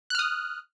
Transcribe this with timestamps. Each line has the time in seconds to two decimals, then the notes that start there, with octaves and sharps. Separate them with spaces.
0.10 F#6
0.15 F6
0.19 D#6